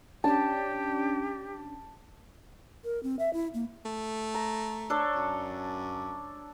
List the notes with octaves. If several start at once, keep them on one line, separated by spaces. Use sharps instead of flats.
C#4 D4 G4 A5
A#4
C4
E5
E4
A#3
A3
A#5
D4 A4 C#5
F#2